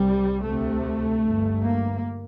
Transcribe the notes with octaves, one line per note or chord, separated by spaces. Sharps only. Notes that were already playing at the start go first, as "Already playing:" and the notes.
Already playing: C2 C3 G3
D2 C3 A3
G1 G2
A#3